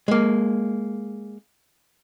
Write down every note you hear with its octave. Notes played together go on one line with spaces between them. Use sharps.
G#3 A#3